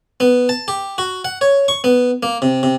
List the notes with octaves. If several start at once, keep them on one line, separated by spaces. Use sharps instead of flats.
B3
A5
G4
F#4
F#5
C#5
C#6
B3
A#3
C3
C3